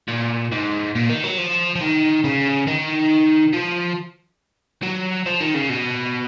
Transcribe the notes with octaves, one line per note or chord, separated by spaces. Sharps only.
A#2
G#2
A#2
D#3
F#3
F3
F3
D#3
C#3
D#3
F3
F#3
F3
D#3
C#3
B2